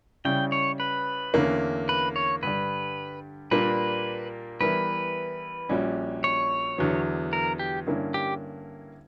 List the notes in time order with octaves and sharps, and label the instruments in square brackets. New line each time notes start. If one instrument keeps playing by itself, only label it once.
[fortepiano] C#3 G3 C#4 E4 [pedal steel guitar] G5
[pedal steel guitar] C#5
B4
[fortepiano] E2 D3 A#3 C#4
[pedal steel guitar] B4
C#5
[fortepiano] G2 D3 G3 [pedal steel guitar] B4
[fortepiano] A#2 G3 A#3 D4 [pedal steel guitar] B4
[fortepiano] E3 G3 B3 E4 A#4 [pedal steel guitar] B4
[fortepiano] A#1 A#2 G3 C#4 F#4
[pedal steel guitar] C#5
[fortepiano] E2 D3 F#3 B3
[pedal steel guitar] A#4
G4
[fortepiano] G2 D3 A#3 C#4 E4
[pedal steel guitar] G4